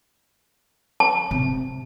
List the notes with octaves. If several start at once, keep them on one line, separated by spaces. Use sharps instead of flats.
A5
C3